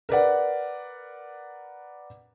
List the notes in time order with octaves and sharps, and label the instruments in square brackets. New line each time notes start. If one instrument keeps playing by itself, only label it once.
[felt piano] A#4 B4 D5 F#5